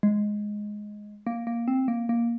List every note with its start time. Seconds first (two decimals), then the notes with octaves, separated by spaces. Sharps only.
0.03 G#3
1.27 A#3
1.47 A#3
1.68 C4
1.88 A#3
2.09 A#3